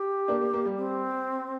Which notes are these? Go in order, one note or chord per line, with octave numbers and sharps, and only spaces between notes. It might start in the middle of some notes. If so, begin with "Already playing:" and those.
Already playing: G4
A#3 D4
A#3
A#3
G3
C4